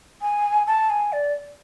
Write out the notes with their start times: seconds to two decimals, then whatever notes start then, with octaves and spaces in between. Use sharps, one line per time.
0.21 G#5
0.67 A5
0.90 G#5
1.12 D5